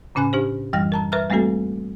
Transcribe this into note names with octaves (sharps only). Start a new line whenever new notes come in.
A2 C#3 C#4 G#5 F#6
D4 G4 C5
F#2 E3 G3 G5 F6 A#6
A#4 A5 A#5
A#4 B4 E5 A#5 F6 F#6
G3 A3 A#3 C4 F#4 A4